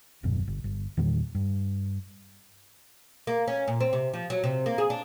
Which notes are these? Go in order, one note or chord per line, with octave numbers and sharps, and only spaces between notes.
D#1 A1 F#2 B2
G1
G1
E2 A#2 D#3 G3
G2
A#3
C#4
A#2
C4
C3
F3
F#3
C3
A#3
G#4
D4